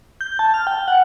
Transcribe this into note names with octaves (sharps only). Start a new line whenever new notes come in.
G6
A5
F6
G5
F#5